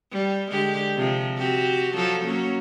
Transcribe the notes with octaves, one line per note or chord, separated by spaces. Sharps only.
G3
D3 G#3 G4
C3 F3
C4 F#4 G4
F3 F#3 A4
F#3 A#3 C#4